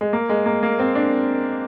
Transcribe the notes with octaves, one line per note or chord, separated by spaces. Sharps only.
G#3
A#3
G#3
A#3
A#3
C4
D4